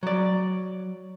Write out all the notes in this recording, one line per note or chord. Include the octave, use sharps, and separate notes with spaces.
F#3 D5